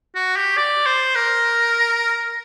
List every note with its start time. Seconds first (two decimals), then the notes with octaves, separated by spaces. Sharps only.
0.15 F#4
0.36 G4
0.57 D5
0.86 C5
1.15 A#4